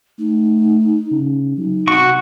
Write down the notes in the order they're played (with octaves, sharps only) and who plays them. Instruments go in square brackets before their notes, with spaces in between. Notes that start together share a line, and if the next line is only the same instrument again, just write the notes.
[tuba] A3 [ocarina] D#4
[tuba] C#3
[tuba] F#3 [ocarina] D#4
[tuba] C3 [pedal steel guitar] F#4 C#6